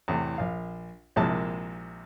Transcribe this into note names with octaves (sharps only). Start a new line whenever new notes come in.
E2 A2 C3
A#1 F5
A#1 C3 G#3 A#3 E4 A5